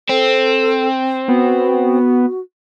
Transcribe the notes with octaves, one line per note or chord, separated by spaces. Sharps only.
C4 A4
B3 F#4